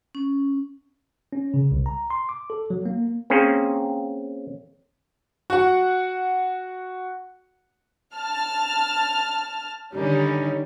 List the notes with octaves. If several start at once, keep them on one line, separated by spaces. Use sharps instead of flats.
C#4
C#4
C#3
C2
A#5
C6
D6
A4
F#3
A#3
A#3 C4 C#4 G#4
F#4 F#5
A5 F6
D3 D#3 G3 C#4 D#4